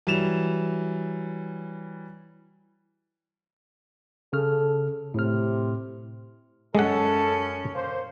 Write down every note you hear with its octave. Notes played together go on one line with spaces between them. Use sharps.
E3 F#3 G3 E7 F7
C#3 A4 F6
A2 C3 F6
F#2 G#3 C#4 A4 F#5
A#3 C5